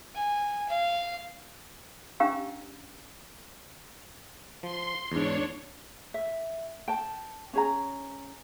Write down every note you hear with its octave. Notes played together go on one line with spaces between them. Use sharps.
G#5
F5
C#4 D4 G4 F5 A#5 E6
F3 C6
E2 G#2 D4 C#5
E5
G5 A5
C#4 G#4 A#5